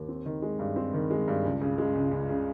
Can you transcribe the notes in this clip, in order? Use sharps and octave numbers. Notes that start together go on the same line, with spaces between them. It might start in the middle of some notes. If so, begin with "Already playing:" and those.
Already playing: D#2
C4
D#3
G#3
G2
C4
D#3
G#3
G2
C#2
C#3
G#3
C#2
C#2
C#3